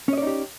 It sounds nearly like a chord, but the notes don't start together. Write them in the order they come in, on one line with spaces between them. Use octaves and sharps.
C#4 D#5 D5 D#4 G4